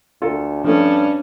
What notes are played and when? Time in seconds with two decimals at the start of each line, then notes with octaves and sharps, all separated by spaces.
0.22 D2 F4 A4 A#4
0.64 G2 F3 A3 C#4 D4